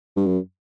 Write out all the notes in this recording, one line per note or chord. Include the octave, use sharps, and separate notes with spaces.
G2
F#2